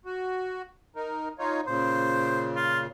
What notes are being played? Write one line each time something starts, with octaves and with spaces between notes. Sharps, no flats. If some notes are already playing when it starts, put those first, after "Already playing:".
F#4
D#4 A#4
D#4 F4 C#5
A#2 C#3 C5
F4